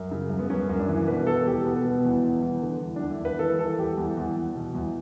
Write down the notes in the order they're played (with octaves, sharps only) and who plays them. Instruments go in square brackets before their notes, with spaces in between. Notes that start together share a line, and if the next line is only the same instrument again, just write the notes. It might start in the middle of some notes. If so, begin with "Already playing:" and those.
Already playing: [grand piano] F#2
C#3
F#2
B3
F#2 C#4
F#2
D4
E3
B2 B4
B2 A4
E2 G4
B2 B3
B2
E2
E2
E2
D3
E2
E2 D4
E4
E2
B4
E3 A4
E3 A4
E2 G4
E2
E2
E2
B2
E2